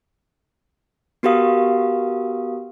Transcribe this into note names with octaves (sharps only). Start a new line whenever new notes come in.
B3 F#4 G4 A#4 F5 D#6